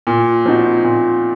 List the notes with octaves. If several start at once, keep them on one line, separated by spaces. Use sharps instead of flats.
A#2
F3 C4 D#4 F#4
A#2